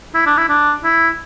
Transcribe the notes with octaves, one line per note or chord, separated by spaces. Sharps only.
E4
D4
E4
D4
E4